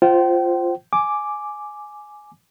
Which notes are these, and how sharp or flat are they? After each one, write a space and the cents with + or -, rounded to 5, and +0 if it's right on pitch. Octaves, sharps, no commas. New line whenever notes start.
F4 -5 C5 +0 G5 -35
G#5 +10 D6 +0